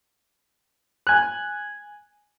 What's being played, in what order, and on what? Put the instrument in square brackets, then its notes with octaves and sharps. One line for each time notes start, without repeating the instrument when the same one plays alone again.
[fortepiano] G#5 F#6